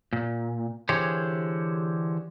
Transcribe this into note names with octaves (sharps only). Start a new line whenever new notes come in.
A#2
D3 E3 G4 G#4 C5 C#5